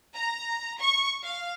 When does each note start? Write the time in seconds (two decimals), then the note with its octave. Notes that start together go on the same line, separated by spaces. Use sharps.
0.14 A#5
0.80 C#6
1.22 F5